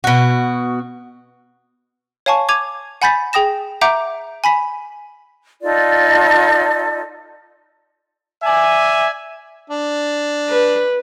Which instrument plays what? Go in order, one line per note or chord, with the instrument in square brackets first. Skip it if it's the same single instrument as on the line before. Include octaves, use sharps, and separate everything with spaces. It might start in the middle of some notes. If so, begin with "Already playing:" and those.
[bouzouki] B2 F#4
[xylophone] C#5 F5 G#5 A5 C#6
D6 G#6 D#7 F7
F#5 G#5 B5 G6 A6 B6
G#4 G5 D#6 A#6 E7
E5 F#5 A#5 D6 G6 D7
G#5 B5 B6
[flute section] D#4 F4 A4 D5
[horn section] D5 E5 G#5
[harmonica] D4
[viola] B4